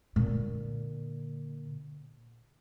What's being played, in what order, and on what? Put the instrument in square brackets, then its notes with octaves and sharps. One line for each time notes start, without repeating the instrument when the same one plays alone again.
[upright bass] A#2 D3